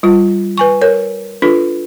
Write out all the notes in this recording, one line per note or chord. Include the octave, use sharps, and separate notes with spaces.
G3 F4
B4 G#5 C#6
A#4 C#5
D4 F4 A4 B4